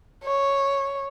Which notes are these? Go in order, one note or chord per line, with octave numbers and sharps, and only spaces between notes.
C#5